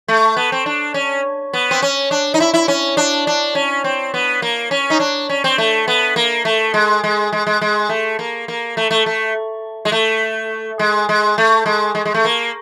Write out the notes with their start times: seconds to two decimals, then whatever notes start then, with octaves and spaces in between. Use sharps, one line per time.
0.08 A3
0.36 B3
0.52 C4
0.66 D4
0.94 C#4
1.53 B3
1.71 C4
1.82 C#4
2.11 D4
2.34 D#4
2.40 E4
2.54 E4
2.68 C#4
2.97 D4
3.27 D4
3.55 C#4
3.84 C4
4.14 B3
4.42 A#3
4.71 C#4
4.90 D#4
5.00 D4
5.29 C#4
5.44 C4
5.58 A3
5.88 B3
6.16 A#3
6.45 A3
6.74 G#3
7.04 G#3
7.33 G#3
7.47 G#3
7.61 G#3
7.89 A3
8.19 A#3
8.48 A#3
8.77 A3
8.91 A3
9.06 A3
9.85 G#3
9.92 A3
10.79 G#3
11.09 G#3
11.38 A3
11.66 G#3
11.95 G#3
12.05 G#3
12.14 A3
12.25 A#3